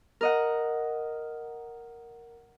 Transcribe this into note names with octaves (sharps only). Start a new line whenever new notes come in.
A#4 D#5 F#5